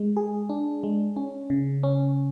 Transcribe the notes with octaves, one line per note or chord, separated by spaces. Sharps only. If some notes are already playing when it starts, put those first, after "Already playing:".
Already playing: G#3
G#4
D4
G#3
C#4
C#3
C#4